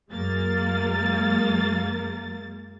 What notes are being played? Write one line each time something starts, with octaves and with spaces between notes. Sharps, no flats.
F#2 G#3 A#3 A6